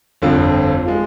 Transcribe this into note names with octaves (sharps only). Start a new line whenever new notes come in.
G1 F2 D3 F3 C4
F3 G#3